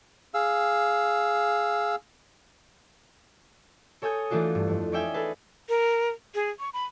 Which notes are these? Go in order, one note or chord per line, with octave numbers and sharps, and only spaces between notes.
G#4 F5 E6
A4 C#5 G#5 D#6 G6
E3 A3 D4 F4 F#4
G2
F2
C#4 D#4 D5 E5 G5 G#5
G#4 A4 B4
A#4
G#4
C#6
B5